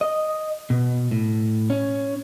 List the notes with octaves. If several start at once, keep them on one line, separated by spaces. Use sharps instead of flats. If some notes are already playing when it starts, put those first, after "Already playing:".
D#5
B2
A2
C#4